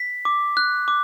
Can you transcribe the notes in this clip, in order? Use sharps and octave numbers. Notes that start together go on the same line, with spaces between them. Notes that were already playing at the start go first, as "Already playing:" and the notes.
Already playing: B6
D6
F#6
D6